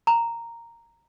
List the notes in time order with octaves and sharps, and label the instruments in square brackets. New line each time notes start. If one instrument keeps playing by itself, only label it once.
[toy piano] A#5